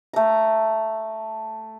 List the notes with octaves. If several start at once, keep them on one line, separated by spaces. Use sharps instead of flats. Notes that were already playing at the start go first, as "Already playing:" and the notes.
A3 A#5